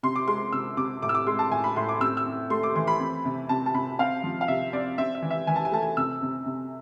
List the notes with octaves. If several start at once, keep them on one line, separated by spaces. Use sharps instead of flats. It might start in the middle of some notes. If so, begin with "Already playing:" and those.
C3 C6
D6
G#3 C6
C3 E6
C3 D6
A2 D6
E6
D6
G#3 C6
A5
A2 G#5
B5
A2 C6
D6
C4 E6
E6
C4
A3 C6
D6
E3 C6
B5
C4
C3
C3 A5
A5
C3 B5
C4 F5
F3
F5
C3 E5
C4 D5
C4 E5
E5
E3
E5
E3 G#5
A5
G#5
A3 A5
G#5
C3 E6
C3
C3